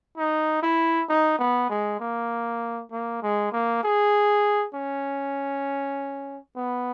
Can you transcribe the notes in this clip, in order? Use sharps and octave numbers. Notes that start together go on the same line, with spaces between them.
D#4
E4
D#4
B3
G#3
A#3
A#3
G#3
A#3
G#4
C#4
B3